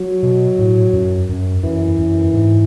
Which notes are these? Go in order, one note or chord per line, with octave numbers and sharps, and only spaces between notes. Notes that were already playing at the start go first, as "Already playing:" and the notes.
Already playing: F#3
B2
A2
F#2
F#2
F#2 E3
F#2
G#2